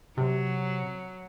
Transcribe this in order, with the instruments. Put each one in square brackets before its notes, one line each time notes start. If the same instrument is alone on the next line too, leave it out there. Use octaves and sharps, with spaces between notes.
[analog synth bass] C3 [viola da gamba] F#3